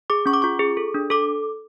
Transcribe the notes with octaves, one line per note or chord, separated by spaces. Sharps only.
G#4 D6
C#4 C#6
D6
F4 C#6
G#4
A4
D4
A4 D6